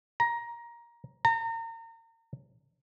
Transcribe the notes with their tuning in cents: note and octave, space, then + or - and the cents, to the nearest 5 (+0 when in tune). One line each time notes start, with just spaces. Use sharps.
A#5 +15
A#5 -35